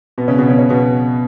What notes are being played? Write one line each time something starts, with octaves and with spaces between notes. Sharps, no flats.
B2 B3
C#3 C#4
B2 B3
C#3 C#4
C#3 C#4
B2 B3